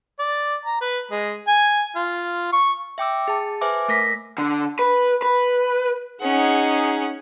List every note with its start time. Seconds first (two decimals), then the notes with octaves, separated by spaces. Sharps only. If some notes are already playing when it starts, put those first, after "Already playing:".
0.19 D5
0.65 A#5
0.81 B4
1.11 G#3
1.47 G#5
1.96 F4
2.53 C#6
2.98 E5 G5 D6 E6
3.28 G#4 A5
3.61 B4 C5 E5 G#5 D6
3.88 A3 A#4 A#6 B6
4.38 D3
4.79 B4
5.22 B4
6.21 C#4 D#4 G#4 F#5